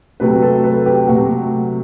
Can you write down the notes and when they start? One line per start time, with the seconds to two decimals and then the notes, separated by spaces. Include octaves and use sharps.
0.20 C3 F#3 A3 B4
0.42 A4
0.64 B4
0.86 G4
1.08 C3 F#3 A3 F#4